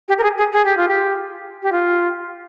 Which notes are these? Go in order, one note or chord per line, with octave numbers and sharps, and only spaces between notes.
G4
A#4
G#4
G#4
G#4
G4
F4
G4
G4
F4